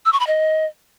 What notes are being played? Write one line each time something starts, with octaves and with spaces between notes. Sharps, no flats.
E6
C#6
B5
D#5